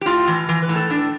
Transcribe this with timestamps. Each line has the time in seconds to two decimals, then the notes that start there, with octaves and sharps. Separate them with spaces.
0.01 G4
0.06 A2 F4
0.28 E3
0.49 E3
0.62 B4
0.69 A2
0.76 A4
0.90 A2 D4